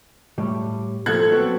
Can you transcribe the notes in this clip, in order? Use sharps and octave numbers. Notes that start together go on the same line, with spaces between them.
A2 G3
A#2 F3 A4 F#6 G#6
F#3 B3 C4